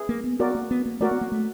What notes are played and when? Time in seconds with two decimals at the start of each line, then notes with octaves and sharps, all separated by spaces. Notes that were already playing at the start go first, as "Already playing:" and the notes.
Already playing: G#4 B4 E5
0.09 A#3
0.24 B3
0.40 B3 F#4 A#4 D5
0.55 A#3
0.71 B3
0.86 A#3
1.00 A3 F#4 A#4 D5
1.11 B3
1.21 A#3
1.32 A3